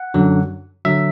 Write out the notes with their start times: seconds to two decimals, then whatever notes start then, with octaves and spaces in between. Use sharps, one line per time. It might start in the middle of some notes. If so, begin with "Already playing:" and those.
Already playing: F#5
0.14 F#2 D3 F#3
0.85 D3 F#3 E5